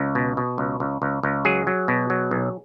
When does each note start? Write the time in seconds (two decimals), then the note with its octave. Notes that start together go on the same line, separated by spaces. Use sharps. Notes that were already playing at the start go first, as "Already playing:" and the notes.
Already playing: C#2
0.15 B2
0.37 B2
0.58 C#2
0.80 C#2
1.02 C#2
1.23 C#2
1.45 F#3 G#4
1.67 F#3
1.88 B2
2.10 F#3
2.31 B1